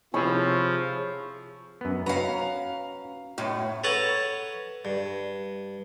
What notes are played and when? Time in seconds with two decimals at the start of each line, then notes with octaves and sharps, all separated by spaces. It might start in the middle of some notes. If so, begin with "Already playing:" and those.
0.14 C3 F3 E4 G#4 C#5 B5 C#6 E6
1.81 F#2 B3
2.06 C#4 F#4 B4 F5 A#5
3.38 F#2 A2
3.84 A4 B4 C#5 F#5 A5 A#5
4.85 G2